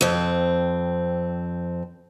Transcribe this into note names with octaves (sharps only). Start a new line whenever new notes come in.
F2 C4